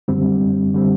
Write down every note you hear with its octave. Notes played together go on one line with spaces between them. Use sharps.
F#2 D3 G3 C4
D3 G3 C4